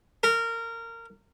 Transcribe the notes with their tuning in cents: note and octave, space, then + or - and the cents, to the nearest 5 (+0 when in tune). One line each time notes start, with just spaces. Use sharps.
A#4 -20